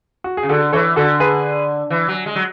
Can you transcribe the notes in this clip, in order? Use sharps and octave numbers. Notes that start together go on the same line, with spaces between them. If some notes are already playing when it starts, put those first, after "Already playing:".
F#4
G#4
C#3
D3 F#4 A4
E3 A4 C#5
D3 F#4 A4
G#4 B4
E3
F#3
G#3
F#3